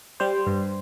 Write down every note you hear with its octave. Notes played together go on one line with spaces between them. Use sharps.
G3 C5
G2